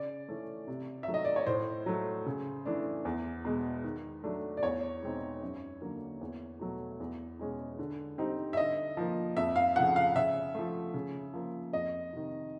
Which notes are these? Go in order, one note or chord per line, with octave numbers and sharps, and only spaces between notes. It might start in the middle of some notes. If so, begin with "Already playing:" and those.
Already playing: C#3 D5
E3 A3 C#4
C3
D#3 F#3 A3 E5
D#5
D5
C#5
A2 C5
F#3 A3
C#3
E3 A3 D4
E2
B2 G#3
D#3
F#3 A3 D4
D5
E2 C#5
B2 G#3 C4 D#4
F#2
D3 F#3 A#3
E2
B2 F#3 A3
E2
B2 G#3 C#4
D3
G3 C4 D#4
E5
D3 D#5
F3 A#3
F2 E5
F5
C#3 F3 A3 F#5
F5
C#3 E5
F3 A3
C#3
F3 A#3
F2 D#5
C3 D#3